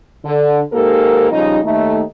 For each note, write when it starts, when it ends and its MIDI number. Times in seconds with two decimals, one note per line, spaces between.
0.25 0.61 50
0.73 1.28 44
0.73 1.28 58
0.73 1.28 67
0.73 1.28 69
0.73 1.28 70
1.32 1.59 49
1.32 1.59 53
1.32 1.59 55
1.32 1.59 63
1.65 2.02 39
1.65 2.02 57
1.65 2.02 63